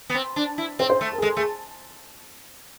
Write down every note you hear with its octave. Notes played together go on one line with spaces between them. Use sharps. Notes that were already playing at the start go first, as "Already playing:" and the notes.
B3
C4
D4
E4
C4 C5
C5
A3
A#4
G#4
G#3 A4
A3 G#4